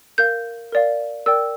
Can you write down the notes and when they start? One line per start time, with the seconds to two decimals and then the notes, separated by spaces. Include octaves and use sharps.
0.18 A#4 F5 G6
0.72 A#4 D5 F5
1.26 A#4 D5 G5 E6